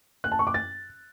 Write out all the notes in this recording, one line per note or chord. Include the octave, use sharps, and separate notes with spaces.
F#6
A5
C#6
D6
A6